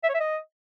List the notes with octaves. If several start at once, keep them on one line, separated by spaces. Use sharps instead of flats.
E5
C#5
E5
D#5